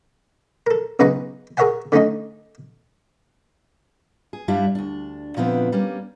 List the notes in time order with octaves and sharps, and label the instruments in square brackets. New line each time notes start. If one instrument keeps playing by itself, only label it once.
[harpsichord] A4 A#4
B1 C#3 D#4 B4 A#5 C#6
G#4 A#4 C#5 E5 F#5 G#5
D3 A3 C#4 D#4 D#5
[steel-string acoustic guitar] G#4
G2 G3 D4 E4 G4 F5
D2 D4
A#2 D3 F3 B3 C4 E4
G3 A#3 C#4